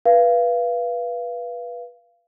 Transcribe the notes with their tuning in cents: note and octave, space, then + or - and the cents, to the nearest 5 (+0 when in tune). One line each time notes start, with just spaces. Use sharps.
B4 -20 F5 -25